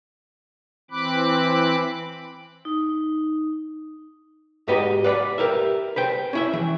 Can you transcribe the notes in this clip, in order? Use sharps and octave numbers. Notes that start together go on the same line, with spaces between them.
E3 C4 B5 D6 F#6
D#4
G#2 F#4 G4 B4 D#5 A#5
B4 D5 F5 F#5 B5
G4 A#4 B4 E5
B4 C5 G5
C#4 E4 E5
E3